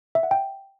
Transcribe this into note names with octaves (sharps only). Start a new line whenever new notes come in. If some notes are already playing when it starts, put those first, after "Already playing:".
E5
F#5
G5